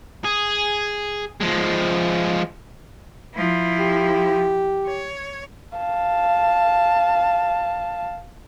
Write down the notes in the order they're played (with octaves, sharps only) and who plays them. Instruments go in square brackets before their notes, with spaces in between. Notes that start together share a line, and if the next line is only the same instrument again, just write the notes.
[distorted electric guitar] G#4
F3 G#3
[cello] F3 E4
[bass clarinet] G4
[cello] C#5
[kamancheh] F5 A5